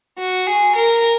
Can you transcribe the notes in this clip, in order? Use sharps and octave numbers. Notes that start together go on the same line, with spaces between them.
F#4
G#4
A#4